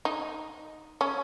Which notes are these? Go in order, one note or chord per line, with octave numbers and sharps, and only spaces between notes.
D#4
C#4